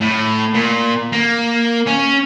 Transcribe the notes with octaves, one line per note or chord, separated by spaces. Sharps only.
A2
A#2
A#3
C#4